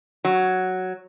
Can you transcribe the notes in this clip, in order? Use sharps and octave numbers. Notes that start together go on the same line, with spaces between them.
F#3